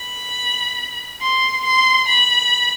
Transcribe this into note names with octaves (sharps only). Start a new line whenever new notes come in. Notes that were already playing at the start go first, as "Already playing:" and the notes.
Already playing: B5
C6
C6
B5